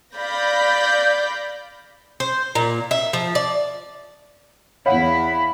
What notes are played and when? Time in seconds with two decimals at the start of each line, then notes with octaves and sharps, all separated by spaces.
0.15 D5 F5 B5 G6 A#6
2.20 C5
2.55 A#2
2.91 E5
3.13 F3
3.35 D5
4.86 E2 E4 C#5 F5 F#5 B5